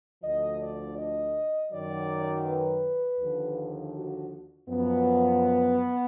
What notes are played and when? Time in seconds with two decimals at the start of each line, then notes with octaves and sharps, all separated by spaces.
0.23 D2 D3 F3 D#5
0.61 D5
0.98 D#5
1.72 F#2 D#3 F#3 D5
2.46 B4
3.20 D#2 D3 F3
3.94 F#4
4.68 F#2 F3 B3